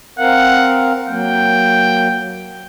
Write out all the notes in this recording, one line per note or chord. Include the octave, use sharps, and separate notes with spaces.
C4 A#4 F5 F#5
F#3 A#3 G5